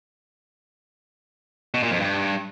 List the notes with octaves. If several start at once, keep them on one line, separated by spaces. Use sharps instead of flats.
B2
A#2
F2
G2